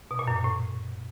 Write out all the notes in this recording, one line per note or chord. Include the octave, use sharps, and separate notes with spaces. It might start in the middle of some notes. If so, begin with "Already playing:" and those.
B2
A#2
F#2
A#2
A2